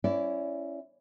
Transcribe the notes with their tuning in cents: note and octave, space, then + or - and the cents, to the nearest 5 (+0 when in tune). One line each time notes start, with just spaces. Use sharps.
C#4 -10 E4 +20 D5 -20